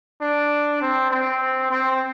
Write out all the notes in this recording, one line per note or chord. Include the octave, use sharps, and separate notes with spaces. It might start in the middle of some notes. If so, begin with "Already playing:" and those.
D4
C4
C4
C4